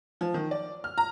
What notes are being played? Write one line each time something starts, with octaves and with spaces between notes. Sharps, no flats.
F3
D#3
D5
F6
A#5